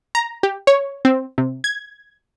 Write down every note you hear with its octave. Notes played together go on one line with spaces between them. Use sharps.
A#5
G4
C#5
C4
C3
G#6